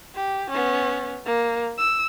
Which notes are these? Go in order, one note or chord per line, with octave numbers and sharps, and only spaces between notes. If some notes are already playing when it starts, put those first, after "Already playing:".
G4
B3 C#4
A#3
E6